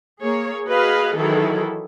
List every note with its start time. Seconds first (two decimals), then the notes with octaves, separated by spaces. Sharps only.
0.21 A#3 G#4 C#5
0.67 F#4 G#4 B4 D#5 F5
1.16 D#3 E3 F#3 E4 G#4 A4